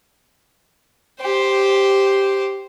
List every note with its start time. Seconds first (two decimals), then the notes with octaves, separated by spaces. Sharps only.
1.22 G4 C5